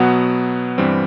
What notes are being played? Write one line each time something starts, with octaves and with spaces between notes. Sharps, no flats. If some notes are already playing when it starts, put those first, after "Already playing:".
Already playing: B2 F#3 B3 F#5
G2 E3 G3 C4